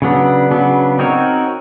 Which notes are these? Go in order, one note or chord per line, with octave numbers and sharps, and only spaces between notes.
C#3 F#3 B3 D4
C#3 F#3 B3 D4
C4 D#4 F#4 A#4 C#5